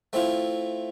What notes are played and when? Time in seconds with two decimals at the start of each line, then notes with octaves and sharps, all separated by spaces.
0.13 A3 C4 E4 F4